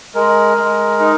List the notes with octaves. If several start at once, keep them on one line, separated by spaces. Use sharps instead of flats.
G#3 A#4
G#3
D#4